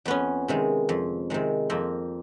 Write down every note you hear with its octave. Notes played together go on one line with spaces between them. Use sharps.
F2 B3 C#4
C3 D#3 G#3
F2
C3 D#3 G#3
F2 A#3 C4